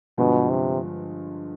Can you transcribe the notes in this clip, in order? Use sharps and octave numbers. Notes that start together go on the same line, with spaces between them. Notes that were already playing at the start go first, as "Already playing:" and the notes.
G2 B2 D3 F3 G#3 B3
C3